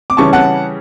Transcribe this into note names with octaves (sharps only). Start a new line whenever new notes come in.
D6
C#3 E3 G3 C#4 A5 C#6
F#5 A5